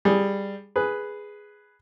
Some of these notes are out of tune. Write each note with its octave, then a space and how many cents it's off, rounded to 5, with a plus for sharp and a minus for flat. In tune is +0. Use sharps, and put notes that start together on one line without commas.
G3 +10 G#4 +0
G#4 +0 B4 +0